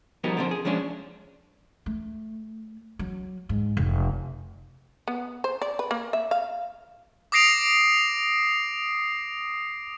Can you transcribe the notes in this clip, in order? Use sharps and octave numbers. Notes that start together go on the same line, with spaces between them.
F3 G3 B3 D#4 F#4 A#4
D3 F3 C4
G#4
F3 G#3 C#4 D4
A3
F#3
G#2
F1
B3
C5
D5
B4
A#3
E5
F5
D6 D#6 A#6 C7 D7 F7